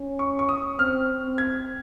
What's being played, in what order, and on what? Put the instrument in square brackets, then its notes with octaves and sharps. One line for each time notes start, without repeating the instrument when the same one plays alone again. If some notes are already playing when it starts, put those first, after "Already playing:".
Already playing: [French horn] C#4
[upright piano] C#6
C#6
D#6
[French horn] C4 [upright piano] F6
[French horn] C4
[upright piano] G#6